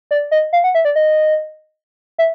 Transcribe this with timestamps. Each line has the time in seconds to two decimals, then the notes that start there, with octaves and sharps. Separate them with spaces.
0.11 D5
0.31 D#5
0.53 F5
0.64 F#5
0.75 E5
0.85 D5
0.96 D#5
2.18 E5